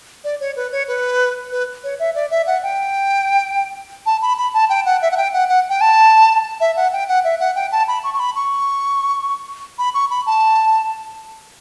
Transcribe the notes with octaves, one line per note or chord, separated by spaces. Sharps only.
D5
C#5
B4
C#5
B4
B4
C#5
E5
D5
E5
F#5
G5
A5
B5
B5
A5
G5
F#5
E5
F#5
G5
F#5
F#5
G5
A5
E5
F#5
G5
F#5
E5
F#5
G5
A5
B5
C#6
C#6
B5
C#6
B5
C#6
B5
A5